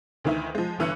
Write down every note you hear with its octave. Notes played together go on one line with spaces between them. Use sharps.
D2 D#3 E3 D#4 E5
F3 G#3
G1 G2 E3 E6 F#6 C#7